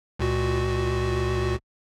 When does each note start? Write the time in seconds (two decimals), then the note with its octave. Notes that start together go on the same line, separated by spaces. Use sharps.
0.19 C#2 A#2 F#4